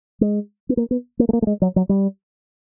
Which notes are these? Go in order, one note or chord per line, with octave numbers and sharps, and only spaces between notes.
G#3
B3
A#3
B3
A#3
A3
A#3
A3
G#3
F#3
F#3
G3